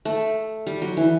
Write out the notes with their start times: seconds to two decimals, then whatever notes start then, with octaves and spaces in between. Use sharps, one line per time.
0.05 A3
0.67 G3
0.82 F#3
0.97 E3